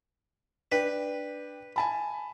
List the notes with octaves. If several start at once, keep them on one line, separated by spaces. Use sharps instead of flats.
D4 B4 G5
G#5 A5 B5